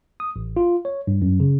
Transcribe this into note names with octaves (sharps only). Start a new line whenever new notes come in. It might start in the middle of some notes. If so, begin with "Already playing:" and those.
D#6
A1
F4
C#5
G2
F#2
C#3